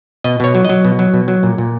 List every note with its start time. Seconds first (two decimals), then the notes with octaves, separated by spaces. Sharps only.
0.24 B2 D#5
0.40 B2 C#5
0.54 F#3
0.65 F#3 D#5
0.85 B2
0.99 F#3
1.14 B2
1.28 F#3
1.43 A#2
1.58 A#2